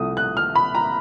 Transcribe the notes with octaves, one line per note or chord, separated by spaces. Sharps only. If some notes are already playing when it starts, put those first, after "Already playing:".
Already playing: C2 C3 F3 A3 D#6
F#6
F6
B5
A#5